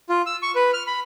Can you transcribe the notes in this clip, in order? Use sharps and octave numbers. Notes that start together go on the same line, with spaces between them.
F4
E6
C#6
B4
F6
B5